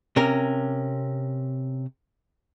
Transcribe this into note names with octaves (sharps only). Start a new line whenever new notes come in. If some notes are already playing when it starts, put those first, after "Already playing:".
C3 C#4 A#4